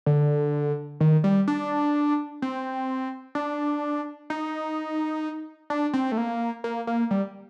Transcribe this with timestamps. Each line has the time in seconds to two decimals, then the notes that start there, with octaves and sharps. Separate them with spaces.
0.06 D3
1.01 D#3
1.24 G3
1.48 D4
2.42 C4
3.35 D4
4.30 D#4
5.70 D4
5.94 C4
6.12 A3
6.18 A#3
6.64 A#3
6.87 A#3
7.11 G3